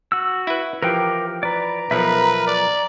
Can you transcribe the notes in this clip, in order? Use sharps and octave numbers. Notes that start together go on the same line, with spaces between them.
F#4 E6
E4 B4
E3 F3 G4 A#4 G5
B4 D5 A#5
B1 F3 A#4 B4 E5
D5